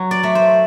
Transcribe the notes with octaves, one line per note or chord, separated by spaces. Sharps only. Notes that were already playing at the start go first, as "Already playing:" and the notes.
Already playing: F#3
D5
A3
C5